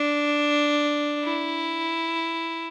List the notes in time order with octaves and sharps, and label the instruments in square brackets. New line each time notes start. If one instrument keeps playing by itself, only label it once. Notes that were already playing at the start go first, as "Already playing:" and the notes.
Already playing: [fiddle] D4
E4